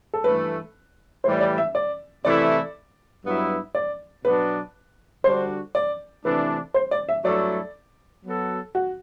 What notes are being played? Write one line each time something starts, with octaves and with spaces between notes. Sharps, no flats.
A4
G2 E3 A3 B4
A2 E3 G3 C5
D5
E5
D5
C3 E3 A3 E4 A4 D5
G2 F#3 B3 E4
D5
B2 F#3 B3 D4 F#4 B4
D3 G3 D4 F#4 C5
D5
C3 E3 A3 D4 B4
C5
D5
E5
G2 F#3 A3 E4 A4 D5
F#3 B3 F#4 A4
F#4